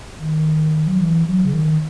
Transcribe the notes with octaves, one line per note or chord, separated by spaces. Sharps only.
D#3
F#3
E3
F#3
C#3
D#3